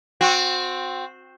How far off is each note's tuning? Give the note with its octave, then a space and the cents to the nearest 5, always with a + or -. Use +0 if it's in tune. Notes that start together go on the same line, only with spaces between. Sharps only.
C4 +0 F#4 -25